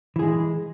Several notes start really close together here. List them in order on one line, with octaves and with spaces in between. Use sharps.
E3 G#4 G#3